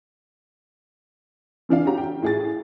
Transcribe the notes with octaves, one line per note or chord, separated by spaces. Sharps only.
C#3 E3 D4 F5
C#4 F#4 G4 A#5
G5
A2 G#4 A6